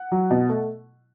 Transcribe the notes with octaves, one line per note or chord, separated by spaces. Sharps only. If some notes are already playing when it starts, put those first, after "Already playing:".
Already playing: F#5
F#3
B2
A3